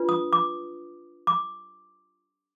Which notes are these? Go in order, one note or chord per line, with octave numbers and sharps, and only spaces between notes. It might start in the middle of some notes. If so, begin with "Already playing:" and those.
Already playing: D4 F4 B4
D#6
D6
D6